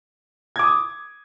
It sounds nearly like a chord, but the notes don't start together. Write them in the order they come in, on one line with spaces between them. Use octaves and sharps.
G#6 D6 D#6